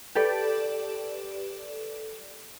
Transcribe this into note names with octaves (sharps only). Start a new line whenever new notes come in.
G4 A4 B4 D5